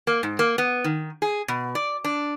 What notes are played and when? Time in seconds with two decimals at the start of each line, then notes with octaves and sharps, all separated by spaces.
0.07 A#3
0.23 G#2
0.39 A#3
0.58 B3
0.84 D#3
1.22 G#4
1.48 B2
1.75 D5
2.04 D4